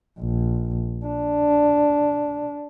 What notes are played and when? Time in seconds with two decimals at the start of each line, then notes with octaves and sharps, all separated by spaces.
0.20 A#1
1.06 D4